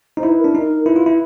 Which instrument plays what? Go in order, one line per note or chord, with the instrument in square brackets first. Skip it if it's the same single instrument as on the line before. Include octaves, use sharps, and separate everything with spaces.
[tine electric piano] D#4 [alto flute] C5
[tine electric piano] E4
[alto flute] B4
A#4
[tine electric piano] D4
D#4
[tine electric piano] E4 [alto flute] B4
[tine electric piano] F4
E4